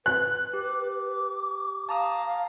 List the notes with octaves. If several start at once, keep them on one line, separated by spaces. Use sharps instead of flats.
B4 F#6
G4 D6
F5 A5 A#5 D#6